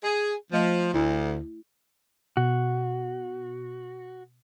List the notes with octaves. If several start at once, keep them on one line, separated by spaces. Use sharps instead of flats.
G#4
F3 A3 D#5
D2 E4
B2 F#4